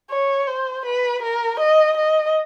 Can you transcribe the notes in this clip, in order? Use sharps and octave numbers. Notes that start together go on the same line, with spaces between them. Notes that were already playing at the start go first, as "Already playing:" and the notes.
C#5
C5
B4
A#4
D#5
D#5